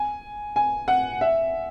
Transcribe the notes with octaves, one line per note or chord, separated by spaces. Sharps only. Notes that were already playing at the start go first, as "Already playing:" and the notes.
Already playing: G#5
G#5
F#5
E5